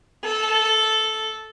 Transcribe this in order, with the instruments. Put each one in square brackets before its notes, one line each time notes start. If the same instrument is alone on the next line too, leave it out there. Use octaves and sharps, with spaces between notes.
[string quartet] A4